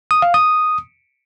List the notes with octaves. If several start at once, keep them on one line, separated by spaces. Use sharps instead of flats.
D#6
F5
D#6